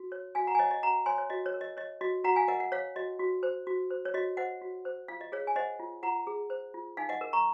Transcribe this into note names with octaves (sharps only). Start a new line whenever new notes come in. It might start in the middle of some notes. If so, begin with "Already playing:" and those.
Already playing: F#4
C#5
F#4 F5 G#5
F#5 A#5
G#5
C#5 D#5 F#5
D#5
F#4 F#5 A#5
C#5 G#5 C6
C#5
F#4 D#5
C#5
A#4
D#5
C#5 D#5
F#4 D#5
F#4 F#5 A#5
F5 G#5
A#4 D#5 F#5
F#5
C#5 F5
F#4 D#5
F#4
C5
F#4
C5
C#5
F#4 D#5
C5 D#5 F#5
F#4
C5
F4 F5
D#5
G#4 C#5 F5
G#5
C5 D#5 F#5
F4
F4 F#5 A#5
G#4
C5
F4
D#4 F5 G#5
D#5 F#5
A#4
A#5 C#6